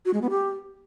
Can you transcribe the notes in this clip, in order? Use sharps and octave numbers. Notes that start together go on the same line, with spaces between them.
F#4
G#3
B3
G4